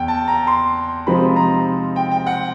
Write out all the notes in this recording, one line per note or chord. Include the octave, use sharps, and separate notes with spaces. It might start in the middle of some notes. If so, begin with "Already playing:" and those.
Already playing: E2 G5
A5
A#5
C6
C3 F3 G#3 C4 D#4 B5
A#5
G5
G5
F#5